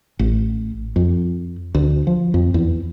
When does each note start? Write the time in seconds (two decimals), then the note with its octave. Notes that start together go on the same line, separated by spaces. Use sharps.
0.19 A1
0.96 F2
1.75 D2
2.07 F3
2.34 F2
2.54 E2